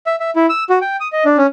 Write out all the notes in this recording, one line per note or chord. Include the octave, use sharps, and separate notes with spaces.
E5
E5
E4
E6
F#4
G5
D#6
D#5
D4
C#4